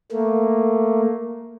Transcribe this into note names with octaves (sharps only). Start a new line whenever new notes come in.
A3 A#3